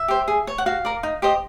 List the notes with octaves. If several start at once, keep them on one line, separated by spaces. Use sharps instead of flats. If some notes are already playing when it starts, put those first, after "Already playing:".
Already playing: E5
G4 C5
G#4
C#5
F#5
F#4 F5
A#4 D5
D#4
G4 C5 D#5